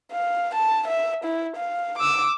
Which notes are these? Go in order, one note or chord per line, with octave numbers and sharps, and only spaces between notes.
F5
A5
E5
E4
F5
D6 E6